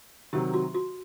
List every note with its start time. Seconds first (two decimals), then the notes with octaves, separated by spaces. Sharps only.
0.33 C3 D#3 F#3 G4
0.54 F#4
0.74 F#4